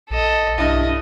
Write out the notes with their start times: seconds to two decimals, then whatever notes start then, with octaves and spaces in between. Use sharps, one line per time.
0.10 A#1 A4 D#5
0.58 B1 G2 E4 D#5